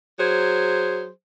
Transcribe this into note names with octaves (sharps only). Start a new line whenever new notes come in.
F#3 G#4 C5